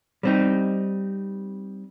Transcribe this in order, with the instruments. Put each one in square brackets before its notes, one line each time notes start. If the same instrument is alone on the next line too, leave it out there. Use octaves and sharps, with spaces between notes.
[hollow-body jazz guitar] G3 C4 D#4